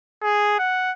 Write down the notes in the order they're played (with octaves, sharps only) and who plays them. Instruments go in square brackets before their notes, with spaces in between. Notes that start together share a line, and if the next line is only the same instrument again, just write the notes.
[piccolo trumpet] G#4
F#5